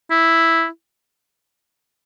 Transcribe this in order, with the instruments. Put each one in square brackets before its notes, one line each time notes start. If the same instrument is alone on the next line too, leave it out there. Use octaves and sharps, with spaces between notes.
[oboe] E4